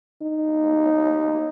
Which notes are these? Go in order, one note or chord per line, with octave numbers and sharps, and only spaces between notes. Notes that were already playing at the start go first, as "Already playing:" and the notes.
D#4